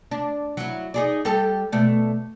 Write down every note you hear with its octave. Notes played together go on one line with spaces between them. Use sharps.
D4
F#3 E4
D#4 G#4 D5
G3 G4 A4
B2 A3 D5